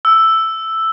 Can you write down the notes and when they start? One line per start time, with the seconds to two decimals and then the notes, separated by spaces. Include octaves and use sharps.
0.05 E6